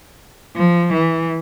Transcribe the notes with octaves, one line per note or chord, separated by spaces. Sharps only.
F3
E3